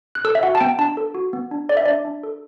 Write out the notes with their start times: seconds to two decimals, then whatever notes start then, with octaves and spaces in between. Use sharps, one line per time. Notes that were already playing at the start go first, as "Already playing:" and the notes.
0.15 F#6
0.25 A4 E6
0.35 E5
0.43 F#4 F#5
0.55 A5
0.60 B3 G5
0.79 D4 A5
0.97 A4
1.15 F#4
1.33 B3
1.51 D4
1.69 A4 D5
1.77 E5
1.86 D4 D5
2.05 D4
2.23 A4